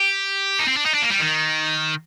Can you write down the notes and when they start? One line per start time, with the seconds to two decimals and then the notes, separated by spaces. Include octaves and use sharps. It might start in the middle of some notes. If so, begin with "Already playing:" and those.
Already playing: G4
0.59 D#4
0.68 C4
0.77 D4
0.86 D#4
0.94 D4
1.02 A#3
1.11 G3
1.20 D#3